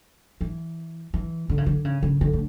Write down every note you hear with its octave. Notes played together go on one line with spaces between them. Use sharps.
E3
E3
D3
C#3
D3
C#3
C#3
D3
A2